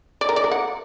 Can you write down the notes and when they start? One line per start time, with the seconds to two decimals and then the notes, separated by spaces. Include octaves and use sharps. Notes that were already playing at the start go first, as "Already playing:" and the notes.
0.21 D5
0.29 A#4
0.36 D5
0.44 A#4
0.51 F#5